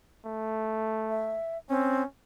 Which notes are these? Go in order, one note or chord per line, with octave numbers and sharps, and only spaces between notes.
A3
E5
C4 C#4